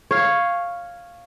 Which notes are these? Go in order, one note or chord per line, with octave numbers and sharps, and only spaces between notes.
C#5 F5